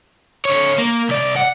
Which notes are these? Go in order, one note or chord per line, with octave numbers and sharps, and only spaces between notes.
D3 C#5
A#3
C2 D5
F#5